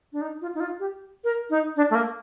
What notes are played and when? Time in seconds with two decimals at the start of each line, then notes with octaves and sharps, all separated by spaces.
0.13 D4
0.21 D#4
0.41 F4
0.55 D#4
0.60 F4
0.80 G4
1.24 A#4
1.50 D#4
1.76 D4
1.90 A3
1.95 A#3